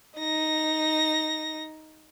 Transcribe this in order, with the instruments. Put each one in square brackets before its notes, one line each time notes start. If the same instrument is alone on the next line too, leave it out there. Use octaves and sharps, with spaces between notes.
[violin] D#4 A#6